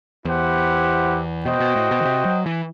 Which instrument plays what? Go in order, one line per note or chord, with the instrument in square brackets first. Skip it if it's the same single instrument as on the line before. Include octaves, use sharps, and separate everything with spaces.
[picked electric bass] E2 [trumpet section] E4 G4 C5 F#5
[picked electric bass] B2 [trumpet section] F#4 C5 D#5 G5
[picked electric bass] B2
A2
B2
D#3
C3
F#3
E3